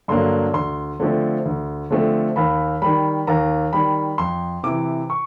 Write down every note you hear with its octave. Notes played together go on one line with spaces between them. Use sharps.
G2 D3 F#3 A#3 C6
D2 C6
D3 F3 A3 C4
D2
D3 F3 A3 C4
D#2 B5
D#3 G3 B5
D#2 A#5
D#3 G3 B5
F2 C6
C3 E3 D6
C#6